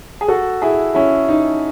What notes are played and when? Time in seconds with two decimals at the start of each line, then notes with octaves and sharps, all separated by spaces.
0.21 G#4
0.28 F#4 A4
0.62 E4 G#4
0.95 C#4 E4
1.29 D#4